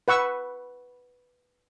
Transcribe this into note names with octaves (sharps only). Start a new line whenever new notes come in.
B4 F#5 C#6 E6